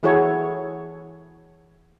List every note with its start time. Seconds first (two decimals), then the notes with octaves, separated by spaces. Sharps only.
0.03 E3 E4 F#4 G#4 A4 C#5